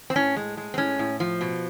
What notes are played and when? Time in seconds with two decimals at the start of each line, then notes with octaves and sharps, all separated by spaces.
0.10 C4
0.16 A2 C#4
0.36 G#3
0.57 G#3
0.74 C4
0.78 A2 C#4
0.99 A2
1.20 F3
1.41 B2